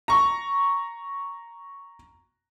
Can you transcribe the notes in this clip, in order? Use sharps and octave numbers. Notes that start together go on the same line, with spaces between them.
A#5 C#6